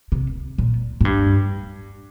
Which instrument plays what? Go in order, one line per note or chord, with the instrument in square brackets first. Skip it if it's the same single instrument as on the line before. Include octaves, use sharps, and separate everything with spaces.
[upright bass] C3
A#2
A2
G2